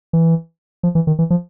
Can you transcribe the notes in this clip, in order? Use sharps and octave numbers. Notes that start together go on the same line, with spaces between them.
E3
F3
E3
D#3
E3
F3